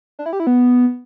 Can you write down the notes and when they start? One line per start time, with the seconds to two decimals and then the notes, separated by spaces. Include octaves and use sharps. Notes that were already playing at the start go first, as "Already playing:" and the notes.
0.19 D4
0.26 E4
0.33 G4
0.40 E4
0.47 B3